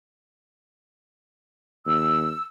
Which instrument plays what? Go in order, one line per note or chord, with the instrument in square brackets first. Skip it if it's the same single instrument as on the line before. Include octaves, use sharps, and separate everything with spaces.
[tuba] D#2 [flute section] E6